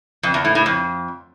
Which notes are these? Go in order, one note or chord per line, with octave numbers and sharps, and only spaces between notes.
F2
E2
A2
A2
F2